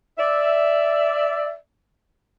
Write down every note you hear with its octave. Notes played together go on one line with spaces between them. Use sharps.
D5 E5